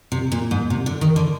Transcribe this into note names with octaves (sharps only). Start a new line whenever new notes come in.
C3
A#2
G#2
C3
D3
D#3
D3